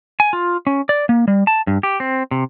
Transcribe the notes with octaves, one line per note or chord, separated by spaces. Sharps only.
G#5
F4
C#4
D5
A#3
G3
A5
G2
G4
C4
C3